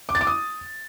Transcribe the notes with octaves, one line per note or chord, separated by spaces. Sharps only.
D6
A6
D6
D#6